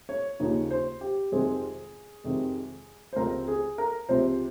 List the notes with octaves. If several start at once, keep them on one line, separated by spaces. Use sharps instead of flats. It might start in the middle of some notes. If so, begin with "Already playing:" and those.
C#5
D#2 C#3 F3 A#3 D#4 C#5
C5
G4
F2 C3 D#3 G#3 C4 G#4
F2 C3 D#3 G#3 C4
C5
C#2 C3 F3 C4 A#4
G#4
A#4
C#2 C3 F3 C4 C5